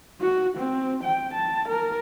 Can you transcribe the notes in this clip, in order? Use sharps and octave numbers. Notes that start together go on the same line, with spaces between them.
F#4
C4
G5
A5
A#4